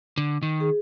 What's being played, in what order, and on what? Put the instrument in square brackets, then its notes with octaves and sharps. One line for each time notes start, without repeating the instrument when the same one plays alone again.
[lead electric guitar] D3
D#3
[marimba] G#4